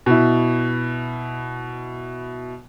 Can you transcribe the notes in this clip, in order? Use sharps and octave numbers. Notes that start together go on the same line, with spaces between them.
B2 E4